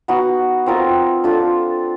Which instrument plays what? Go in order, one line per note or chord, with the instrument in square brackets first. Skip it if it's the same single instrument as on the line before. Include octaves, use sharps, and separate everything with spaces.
[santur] B3 D#4 F#4
C4 F4 A#4 D#5
D4 F4 A4 D5